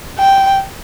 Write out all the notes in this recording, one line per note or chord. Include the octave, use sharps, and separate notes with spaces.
G5